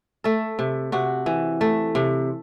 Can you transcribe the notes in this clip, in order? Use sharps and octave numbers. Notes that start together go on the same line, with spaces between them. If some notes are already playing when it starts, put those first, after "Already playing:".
A3 A4
C3
C3 F#4
E3
A3
C3